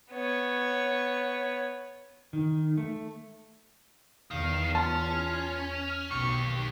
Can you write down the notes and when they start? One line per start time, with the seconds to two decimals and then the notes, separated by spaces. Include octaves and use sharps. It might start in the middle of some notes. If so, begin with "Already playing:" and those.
0.11 B3 C#5
2.33 D#3
2.77 A3
4.31 E2 D#3 F5
4.75 C#4 F4 A5 C6
6.11 B1 D#3 G4 C#6